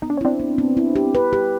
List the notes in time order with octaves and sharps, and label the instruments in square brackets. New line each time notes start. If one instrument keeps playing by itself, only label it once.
[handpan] B3 [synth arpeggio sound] D#4
[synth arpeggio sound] D4
C#4
[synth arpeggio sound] C4 D4 [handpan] E4
[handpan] B3
B3
E4
G4
B4
G4